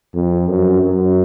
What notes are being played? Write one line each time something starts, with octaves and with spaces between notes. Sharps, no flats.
F2
F#2
F#2